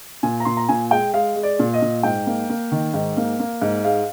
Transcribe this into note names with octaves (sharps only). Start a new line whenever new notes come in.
A#2 G#5
A#5
A#2 C6
A#5
A#2 G#5
G#3 G5
G#3 F5
G#3
D5
A#2
D#5
A#2
G#2 G5
A#3
A#3
D#3
G#2
A#3
A#3
G#2
G#3 F5